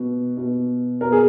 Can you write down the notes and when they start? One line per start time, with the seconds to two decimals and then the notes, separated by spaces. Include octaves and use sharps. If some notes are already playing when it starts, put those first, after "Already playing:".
Already playing: B2
0.37 B2
1.01 B2 A#4
1.12 G#4